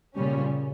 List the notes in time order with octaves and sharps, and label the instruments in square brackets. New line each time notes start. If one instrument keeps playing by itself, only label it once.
[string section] A#2 G3 C#4 [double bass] C#3